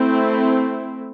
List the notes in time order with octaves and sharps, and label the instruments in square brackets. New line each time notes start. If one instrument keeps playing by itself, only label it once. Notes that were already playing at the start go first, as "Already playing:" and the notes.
Already playing: [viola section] A3 C4 E4